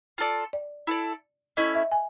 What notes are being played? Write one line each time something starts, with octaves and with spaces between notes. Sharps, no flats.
F4 A4 D5
D5
E4 A4 D5
A3 C#4 E4 D#5
E5
G#5